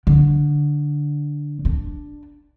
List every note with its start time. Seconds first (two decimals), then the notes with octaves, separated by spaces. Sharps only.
0.07 D3
1.65 D4